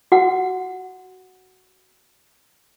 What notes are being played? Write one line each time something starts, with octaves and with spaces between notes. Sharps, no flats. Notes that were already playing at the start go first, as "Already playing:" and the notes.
F#4 F#5